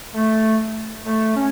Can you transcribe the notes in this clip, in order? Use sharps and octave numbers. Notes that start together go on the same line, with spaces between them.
A3
A3
C#4